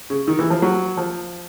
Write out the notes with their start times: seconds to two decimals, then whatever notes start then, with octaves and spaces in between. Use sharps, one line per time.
0.10 C#3
0.28 D#3
0.39 E3
0.50 F3
0.62 F#3
0.97 F3